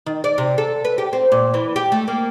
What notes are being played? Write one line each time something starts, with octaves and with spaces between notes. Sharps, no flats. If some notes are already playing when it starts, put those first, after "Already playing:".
D#3
D5
C3
A4
B4
G4
C4
A#2
E3
G4
A3
A#3